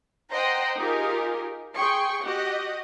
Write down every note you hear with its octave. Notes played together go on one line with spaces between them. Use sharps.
C5 D#5 F#5 G5 A#5 C6
D#4 F4 G4 G#4 A#4
G#4 G5 C6 C#6
F#4 G4 D#5 F#5